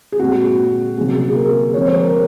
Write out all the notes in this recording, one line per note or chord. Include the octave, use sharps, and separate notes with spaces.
G#4
A#2 G#3 C4 F#4
C3 F#3 A#3 C#4 G#4
G#4
A#4
F3 G#3 C4 C#5
C5
A#4